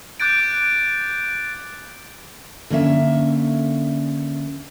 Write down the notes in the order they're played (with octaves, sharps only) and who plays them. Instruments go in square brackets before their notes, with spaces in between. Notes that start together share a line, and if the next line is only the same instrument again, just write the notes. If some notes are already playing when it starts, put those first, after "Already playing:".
[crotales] D6 F#6 G6 A6 D7
[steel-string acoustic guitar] D3 A#3 C#4 E5